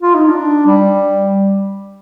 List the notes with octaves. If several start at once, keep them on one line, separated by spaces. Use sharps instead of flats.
F4
D#4
D4
G3